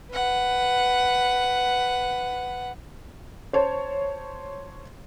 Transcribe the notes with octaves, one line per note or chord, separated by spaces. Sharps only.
B4 F#5
C5 C#5 A5